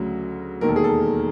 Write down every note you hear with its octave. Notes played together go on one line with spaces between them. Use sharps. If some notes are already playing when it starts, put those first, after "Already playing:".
Already playing: D2 C#3 F#3 F#4
E1 D#2 D#3 A#4
A4
G#4
A4